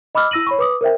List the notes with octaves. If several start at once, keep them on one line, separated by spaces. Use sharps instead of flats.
D#5 B5 D6 E6 F6
E4 E6 A#6 D#7 F#7
C#5 B5 C#6
B4 D6 D#6
A#4 C5 E5 G5